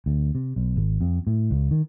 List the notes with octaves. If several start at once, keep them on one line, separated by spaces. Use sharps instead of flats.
D2
C3
B1
G#1
F2
A2
C#2
D#3